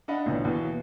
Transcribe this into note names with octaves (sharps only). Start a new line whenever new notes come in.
D4 D#5 F5 F#5 B5
A1 A#2 D3 E3 C#4 D5
D#2 B2 E3